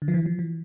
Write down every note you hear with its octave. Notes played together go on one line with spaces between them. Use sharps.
D3
F3
E3
F3
E3